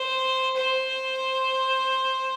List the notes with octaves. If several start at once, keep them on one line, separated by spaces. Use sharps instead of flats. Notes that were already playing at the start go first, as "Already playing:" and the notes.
Already playing: C5
C5